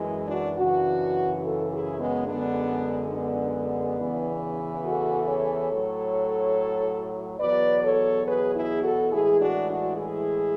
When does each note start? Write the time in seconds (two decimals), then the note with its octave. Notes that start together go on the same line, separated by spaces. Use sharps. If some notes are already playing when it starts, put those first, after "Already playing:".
Already playing: F#2 E3 G#3
0.28 D4 F#4
0.57 F#2 C#3 E3 D4 F#4
1.42 F#4 A4
1.71 E4 G#4
1.99 G#3 B3
2.27 F#2 D3 G#3 B3 D4
3.13 B3 D4
3.99 E2 C#3 E3
4.84 F#4 A4
5.27 A4 C#5
5.69 A2 F#3
7.40 E2 B2 F#3 B4 D5
7.83 A4 C#5
8.26 G#4 B4
8.54 E4 G#4
8.83 F#4 A4
9.11 A2 E3 G#3 E4 G#4
9.40 D4 F#4
9.69 D4 F#4
9.96 E4 G#4